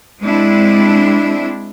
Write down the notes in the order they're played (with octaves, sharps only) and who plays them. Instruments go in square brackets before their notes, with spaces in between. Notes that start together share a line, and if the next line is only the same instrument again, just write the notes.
[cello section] G#3 C4 D4 E4